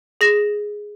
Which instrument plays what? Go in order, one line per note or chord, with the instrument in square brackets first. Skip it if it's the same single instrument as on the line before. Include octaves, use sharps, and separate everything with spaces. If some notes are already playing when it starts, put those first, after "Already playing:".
[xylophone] G#4 A#6 E7